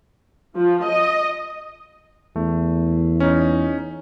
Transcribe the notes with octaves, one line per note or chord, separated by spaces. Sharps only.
F3
D#5
E2 A3
C#4 D#4